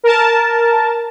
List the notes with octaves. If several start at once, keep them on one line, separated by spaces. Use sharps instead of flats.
A#4 A5